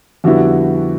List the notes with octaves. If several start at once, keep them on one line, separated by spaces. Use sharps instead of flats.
F2 D3 G3 B3 E4 F#4